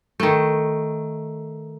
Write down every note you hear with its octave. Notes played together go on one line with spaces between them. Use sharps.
D#3 A3